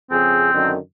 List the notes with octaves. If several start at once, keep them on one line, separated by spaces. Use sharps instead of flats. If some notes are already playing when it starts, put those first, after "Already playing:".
F2 C#3 C4 G#4
F#2 D3 D#3